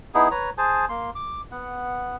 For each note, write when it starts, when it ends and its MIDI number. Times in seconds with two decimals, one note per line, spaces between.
0.15 0.28 59
0.15 0.28 63
0.15 0.28 64
0.15 0.28 68
0.31 0.50 71
0.31 0.50 73
0.31 0.50 82
0.58 0.85 68
0.58 0.85 72
0.58 0.85 80
0.58 0.85 81
0.89 1.10 58
0.89 1.10 84
1.15 1.41 86
1.52 2.16 59
1.52 2.16 78